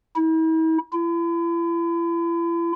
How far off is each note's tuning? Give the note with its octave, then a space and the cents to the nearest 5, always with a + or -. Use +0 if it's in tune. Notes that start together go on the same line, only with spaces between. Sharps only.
E4 -45
E4 +40